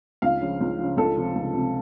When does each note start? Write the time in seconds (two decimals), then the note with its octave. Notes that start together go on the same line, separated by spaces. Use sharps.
0.22 C#2 F5
0.41 C#3 F3
0.60 C#2
0.79 C#3 F3
0.97 C#2 A4
1.16 C3 F3
1.36 C#2
1.54 C3 F3